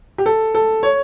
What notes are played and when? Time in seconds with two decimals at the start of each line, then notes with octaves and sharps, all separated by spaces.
0.18 G4
0.26 A4
0.55 A4
0.83 C#5